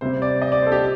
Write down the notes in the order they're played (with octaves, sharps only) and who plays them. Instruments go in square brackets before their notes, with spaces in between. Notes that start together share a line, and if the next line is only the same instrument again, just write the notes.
[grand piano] C3 G3 C4 C5
D5
D#5
D5
C5
A4
G4